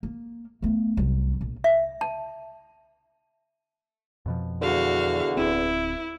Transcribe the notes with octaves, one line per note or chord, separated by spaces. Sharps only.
A#3
A3 B3
C2 F#3
A#1
E5
A5
F2 B2 F3
E2 D3 F#4 F5
D1 C4 E4